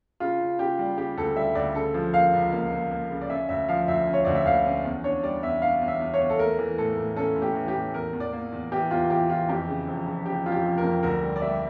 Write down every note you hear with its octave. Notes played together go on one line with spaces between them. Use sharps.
C#3 F4
C#3
C#3 G4
G3
C#3 G4
D2 A4
G3 E5
D2 D5
C#3 A4
F3
A#3 F5
C#2
A#3
A#3
A#3
C#3
D5
C#4 E5
D2 E5
F3 F5
D2 E5
C#4
C#5
D2 D5
E5
D2 F5
C#4
E2
D4 C#5
G3 D5
E2 E5
D4 F5
E2
E5
E2
C#5
E2
A4
A3 A#4
E3
A2 A4
A2
C#4 A4
A2
G4
E3
G4
A2
E2 A#4
E2
D5
A#3
E2
E3 G4
E2 F4
E3 G4
E3 F4
F2 G4
C#3
F1
C#3
C#3 G4
F1 F4
G4
F1
A#4
F2
D2 A#4
G3
D5
G3 E5